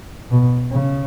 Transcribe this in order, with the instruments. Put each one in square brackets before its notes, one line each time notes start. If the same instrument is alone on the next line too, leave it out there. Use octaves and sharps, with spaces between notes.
[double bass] B2
C#3